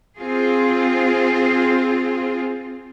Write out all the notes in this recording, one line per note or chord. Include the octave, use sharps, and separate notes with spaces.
C4 F4 G#4